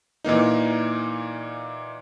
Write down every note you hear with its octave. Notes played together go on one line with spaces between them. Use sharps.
A#2 E3 A#3 D#4